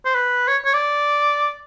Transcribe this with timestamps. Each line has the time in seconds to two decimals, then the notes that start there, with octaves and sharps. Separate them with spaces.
0.05 C5
0.15 B4
0.48 C#5
0.65 C#5
0.74 D5